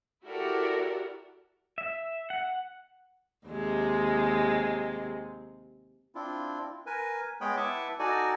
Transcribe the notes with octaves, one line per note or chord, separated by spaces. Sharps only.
E4 F#4 G4 A4 A#4 D5
E5
F#5
D#2 C3 G#3
C4 D4 E4 F4
A#4 B4 G#5
G#3 B3 G#4 C#5 G5 B5
E4 B4 E5 F#5 A5 D6
D#4 F#4 A4 D5 G#5